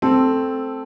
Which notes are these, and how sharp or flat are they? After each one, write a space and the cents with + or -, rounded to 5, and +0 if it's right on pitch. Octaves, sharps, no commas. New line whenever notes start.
A3 +0 C4 +0 A4 +0